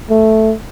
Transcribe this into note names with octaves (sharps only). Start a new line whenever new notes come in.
A3